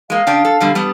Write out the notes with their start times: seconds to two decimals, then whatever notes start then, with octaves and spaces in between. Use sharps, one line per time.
0.10 G#3 A#3 F5
0.27 C#3 D4 G5
0.45 A4
0.60 B2 D3 G3
0.75 G3 B3